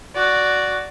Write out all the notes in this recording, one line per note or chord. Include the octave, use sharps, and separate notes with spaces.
F#4 D5